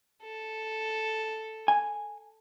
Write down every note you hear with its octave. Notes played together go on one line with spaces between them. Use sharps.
A4
G#5